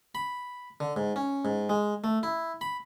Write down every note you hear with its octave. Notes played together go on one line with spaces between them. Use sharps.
B5
D3
G#2
C#4
G#2
G#3
A3
E4
B5